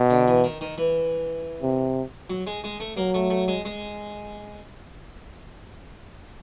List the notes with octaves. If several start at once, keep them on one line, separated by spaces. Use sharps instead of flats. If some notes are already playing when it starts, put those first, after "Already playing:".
Already playing: B2
D3
E3
D#3
D#3
E3
C3
F#3
G#3
G#3
A3
F#3 A#3
A3
A3
G#3
G#3